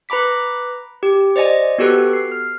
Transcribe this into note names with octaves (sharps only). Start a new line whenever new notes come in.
B4 A#5 B5 D6 B6
G4
C5 D5 D#5 G#5
B3 F#4 G4 A4 B4
C7
F6